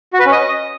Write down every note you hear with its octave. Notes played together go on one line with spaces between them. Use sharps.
F#4
B4
C#4
D#5